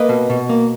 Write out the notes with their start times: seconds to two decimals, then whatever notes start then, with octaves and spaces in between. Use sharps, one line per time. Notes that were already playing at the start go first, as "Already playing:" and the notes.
Already playing: A#3 B4 D#5
0.09 B2
0.30 B2
0.49 A#3